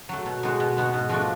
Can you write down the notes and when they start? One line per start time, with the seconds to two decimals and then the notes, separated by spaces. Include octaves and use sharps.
0.09 F#3 A3
0.26 B2
0.43 G#3 B3 D#4 F#4
0.60 B2
0.76 G#3 B3 D#4 F#4
0.94 G#2
1.09 F3 A3 D4 F#4